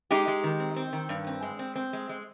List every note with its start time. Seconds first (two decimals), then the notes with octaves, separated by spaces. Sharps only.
0.11 G#3 D#4 G4
0.28 G#3
0.44 D#3
0.60 C4
0.76 C4
0.93 D#3
1.09 G2
1.27 C4
1.43 G#3
1.59 C4
1.75 C4
1.93 G#3
2.09 G#3